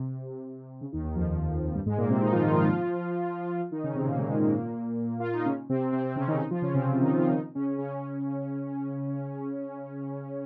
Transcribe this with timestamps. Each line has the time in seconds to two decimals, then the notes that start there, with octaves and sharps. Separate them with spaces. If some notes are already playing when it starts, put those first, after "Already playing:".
Already playing: C3
0.81 C#3
0.92 D#2 D#3
1.04 D#2 D#3
1.16 F2 F3
1.75 G2 G3
1.86 G#2 G#3
1.98 A#2 A#3
2.10 C3 C4
2.21 D#3 D#4
2.32 F3 F4
2.44 D#3 D#4
2.56 F3 F4
3.71 D#3 D#4
3.84 C#3 C#4
3.95 C3 C4
4.06 A#2 A#3
4.18 G#2 G#3
4.30 G#2 G#3
4.42 A#2 A#3
5.20 F4
5.34 D#4
5.46 C#3 C#4
5.69 C3 C4
5.92 C3 C4
6.04 C3 C4
6.16 C#3 C#4
6.27 D#3 D#4
6.39 D#3 D#4
6.51 F3 F4
6.62 C#3 C#4
6.74 C3 C4
6.86 C#3 C#4
7.02 D#3 D#4
7.16 F3 F4
7.32 D#3 D#4
7.55 C#3 C#4
7.78 C#3 C#4